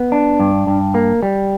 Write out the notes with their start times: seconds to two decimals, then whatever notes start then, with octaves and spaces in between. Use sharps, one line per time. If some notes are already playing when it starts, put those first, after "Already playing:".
Already playing: B3
0.12 D4
0.40 G2
0.67 G2
0.95 A#3
1.23 G3